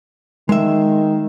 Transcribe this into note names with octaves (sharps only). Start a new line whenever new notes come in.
D#3 G#3 E5